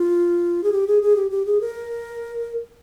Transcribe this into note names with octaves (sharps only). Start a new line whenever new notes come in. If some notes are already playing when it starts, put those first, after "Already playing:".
Already playing: F4
G#4
G4
G#4
G#4
G4
G4
G#4
A#4